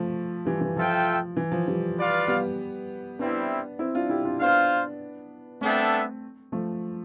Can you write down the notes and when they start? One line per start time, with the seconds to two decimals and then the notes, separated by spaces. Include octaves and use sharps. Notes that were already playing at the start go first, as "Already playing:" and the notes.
Already playing: F3 A3
0.45 E3 G3
0.61 E3
0.76 F3 F4 A4 E5 G5
1.37 E3
1.52 F3
1.67 E3 G3
1.98 F4 B4 D5 F5
2.28 G3 B3
3.19 G3 B3 C4 D4 E4
3.79 C4 E4
3.95 D4 F4
4.09 E4 G4
4.25 D4 F4
4.40 B3 D4 F4 C5 F5
5.61 A3 B3 C4 D4 A4 E5 G5
6.52 F3 A3